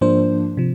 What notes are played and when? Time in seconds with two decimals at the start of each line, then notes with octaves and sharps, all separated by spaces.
0.01 G#2 F3 A#3 D4 C5
0.57 C3 F3